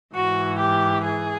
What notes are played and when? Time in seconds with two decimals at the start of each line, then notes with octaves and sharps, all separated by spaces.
0.14 G#2 E3 F#4
0.59 G4
1.05 G#4